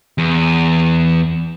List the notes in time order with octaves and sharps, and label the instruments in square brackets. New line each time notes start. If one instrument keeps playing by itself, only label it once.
[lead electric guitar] E2